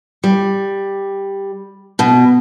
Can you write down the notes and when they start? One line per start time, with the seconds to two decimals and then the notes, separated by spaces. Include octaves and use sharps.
0.24 G3
1.99 B2